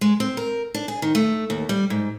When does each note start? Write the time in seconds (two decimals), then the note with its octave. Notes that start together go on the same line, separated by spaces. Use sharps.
0.01 G#3
0.20 C4
0.37 A#4
0.74 D4
0.88 G#4
1.02 D#3
1.15 A3
1.50 D#2
1.69 G3
1.90 G#2